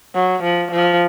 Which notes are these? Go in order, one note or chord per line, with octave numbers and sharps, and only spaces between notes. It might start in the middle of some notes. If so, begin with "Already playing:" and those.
F#3
F3
F3